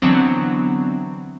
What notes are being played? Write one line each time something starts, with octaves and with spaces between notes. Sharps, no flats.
D3 E3 F#3 B3 C4 D4